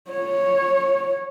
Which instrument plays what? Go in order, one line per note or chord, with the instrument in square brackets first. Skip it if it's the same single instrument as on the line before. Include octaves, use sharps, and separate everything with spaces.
[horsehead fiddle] C#5